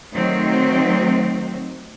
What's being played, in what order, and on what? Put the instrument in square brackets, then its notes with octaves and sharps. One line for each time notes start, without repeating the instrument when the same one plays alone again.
[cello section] D#3 F#3 A3 C4